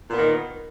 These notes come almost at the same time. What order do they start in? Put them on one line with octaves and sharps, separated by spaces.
A#2 B3 D#3